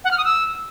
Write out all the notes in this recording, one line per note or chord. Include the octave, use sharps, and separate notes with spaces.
F#5
F6
D#6
E6